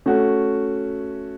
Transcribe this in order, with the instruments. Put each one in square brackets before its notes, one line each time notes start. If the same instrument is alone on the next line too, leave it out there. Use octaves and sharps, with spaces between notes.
[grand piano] A3 C#4 F#4 A4